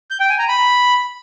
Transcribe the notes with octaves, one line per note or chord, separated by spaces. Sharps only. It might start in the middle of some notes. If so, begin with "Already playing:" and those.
G6
G5
G#5
A#5
B5